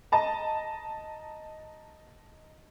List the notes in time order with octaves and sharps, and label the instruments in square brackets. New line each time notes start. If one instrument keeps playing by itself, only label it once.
[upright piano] D#5 A5 A#5